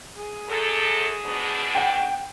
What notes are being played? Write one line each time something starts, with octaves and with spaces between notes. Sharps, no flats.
G#4
F#2 A4
G#2 B2 D4
F#5 G5